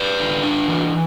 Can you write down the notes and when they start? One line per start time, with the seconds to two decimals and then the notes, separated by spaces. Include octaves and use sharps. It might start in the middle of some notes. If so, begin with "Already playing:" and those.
Already playing: B4 D5
0.19 D3
0.43 D4
0.68 E3